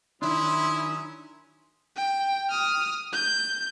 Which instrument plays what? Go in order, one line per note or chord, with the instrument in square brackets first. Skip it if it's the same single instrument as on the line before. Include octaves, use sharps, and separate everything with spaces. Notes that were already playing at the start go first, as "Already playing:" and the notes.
[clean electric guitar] D#3 D4 [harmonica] F#3 C#4 D#6 [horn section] E4 [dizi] C6
[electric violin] G5
D#6 F6
G6